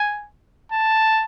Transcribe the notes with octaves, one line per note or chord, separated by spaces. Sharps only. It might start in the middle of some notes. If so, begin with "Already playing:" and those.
Already playing: G#5
A5